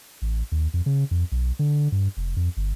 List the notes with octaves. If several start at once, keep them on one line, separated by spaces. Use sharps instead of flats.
A1
D#2
F2
C#3
F2
B1
D3
G2
F1
F2
G1